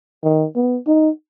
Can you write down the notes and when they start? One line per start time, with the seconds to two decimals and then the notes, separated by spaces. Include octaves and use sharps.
0.24 D#3
0.56 B3
0.87 D#4